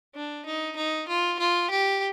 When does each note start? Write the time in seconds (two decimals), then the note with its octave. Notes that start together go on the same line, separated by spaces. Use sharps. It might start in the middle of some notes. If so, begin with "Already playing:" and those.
0.15 D4
0.46 D#4
0.76 D#4
1.08 F4
1.39 F4
1.70 G4